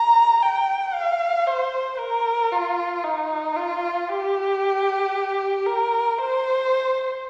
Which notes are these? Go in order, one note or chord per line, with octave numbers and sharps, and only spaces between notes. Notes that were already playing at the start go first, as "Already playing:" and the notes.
Already playing: A#5
G5
F5
C5
A#4
F4
D#4
F4
G4
A#4
C5